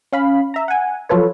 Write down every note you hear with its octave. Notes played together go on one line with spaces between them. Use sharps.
C#4 F5 B5
E5 A#5
F#5 G#5
F3 F#3 F4 A4 B4 C#5